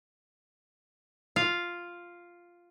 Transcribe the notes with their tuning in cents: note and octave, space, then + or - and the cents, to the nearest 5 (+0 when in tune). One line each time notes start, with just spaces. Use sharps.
F4 +0 F5 +0